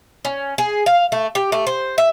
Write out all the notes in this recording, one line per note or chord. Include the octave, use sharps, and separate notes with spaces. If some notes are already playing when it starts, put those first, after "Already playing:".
C#4
G#4
F5
A3
G4
A3
C5
E5